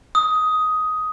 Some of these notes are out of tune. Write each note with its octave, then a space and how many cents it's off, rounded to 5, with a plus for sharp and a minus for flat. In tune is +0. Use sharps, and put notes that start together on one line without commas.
D#6 +10